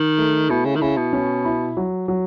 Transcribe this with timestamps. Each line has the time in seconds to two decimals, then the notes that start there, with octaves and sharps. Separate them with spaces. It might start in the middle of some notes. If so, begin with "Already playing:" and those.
Already playing: D#3
0.18 A3
0.49 B2 E4
0.65 C#3
0.75 D#3
0.81 C#3 E4
0.97 B2
1.13 C#4
1.45 E4
1.77 F#3
2.08 F#3